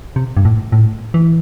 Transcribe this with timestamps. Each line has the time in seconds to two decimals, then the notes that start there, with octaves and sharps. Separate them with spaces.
0.16 C3
0.37 G2
0.45 A2
0.72 A2
1.14 E3